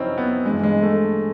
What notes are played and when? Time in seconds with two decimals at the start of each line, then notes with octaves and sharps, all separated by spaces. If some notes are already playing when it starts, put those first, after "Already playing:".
Already playing: F#2 C#3 F3 C4 C#4 D#4 E4
0.18 B3
0.46 G2 E3 G#3
0.63 G#3
0.82 A3